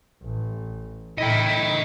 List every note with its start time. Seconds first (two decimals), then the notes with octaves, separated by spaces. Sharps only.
0.23 A1
1.18 A2 E4 D#5 G5